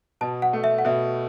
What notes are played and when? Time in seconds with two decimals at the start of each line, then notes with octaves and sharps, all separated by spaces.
0.21 B2 A5
0.42 F#5
0.53 A3
0.64 E5
0.78 F#5
0.85 B2 E5